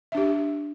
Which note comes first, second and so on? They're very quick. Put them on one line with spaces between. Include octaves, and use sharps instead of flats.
E5 D4 G4